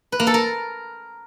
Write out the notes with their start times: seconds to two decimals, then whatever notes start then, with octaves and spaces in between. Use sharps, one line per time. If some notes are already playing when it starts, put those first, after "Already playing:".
0.12 B4
0.20 A#3
0.27 A4
0.34 A#4